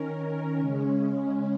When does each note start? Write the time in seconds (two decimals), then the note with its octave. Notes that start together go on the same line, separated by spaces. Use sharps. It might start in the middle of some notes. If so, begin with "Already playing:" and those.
Already playing: D#3 C#4 A#4
0.59 C#3 G#3 C#4